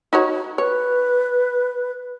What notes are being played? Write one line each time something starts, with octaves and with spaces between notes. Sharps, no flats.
D#4 F#4 C#5
B4 C#5